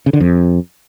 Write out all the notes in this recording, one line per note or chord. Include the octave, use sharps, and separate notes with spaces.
C#3
D3
F2